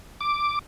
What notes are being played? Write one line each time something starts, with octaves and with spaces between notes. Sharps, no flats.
D6